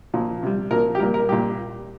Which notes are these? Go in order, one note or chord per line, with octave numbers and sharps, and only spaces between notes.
A#2 F3
C3 G3
A#2 F3 A#4
G4
A#2 G3 A#4
A#4
A#2 G3 G4